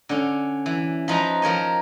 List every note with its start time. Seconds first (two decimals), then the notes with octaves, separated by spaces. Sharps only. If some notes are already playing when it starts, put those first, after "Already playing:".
0.09 D3 C#4
0.66 E3
1.08 F3 D#4 B4 A#5
1.42 F3 A#4 C#5 D#5